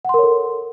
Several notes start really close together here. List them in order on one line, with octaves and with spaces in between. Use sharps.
F#5 C6 A#4 C#5 A4